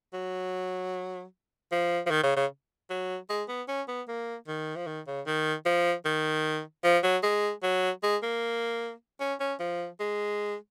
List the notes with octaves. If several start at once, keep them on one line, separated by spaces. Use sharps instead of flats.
F#3
F3
F3
D#3
C#3
C#3
F#3
G#3
B3
C#4
B3
A#3
D#3
F3
D#3
C#3
D#3
F3
D#3
F3
F#3
G#3
F#3
G#3
A#3
C#4
C#4
F3
G#3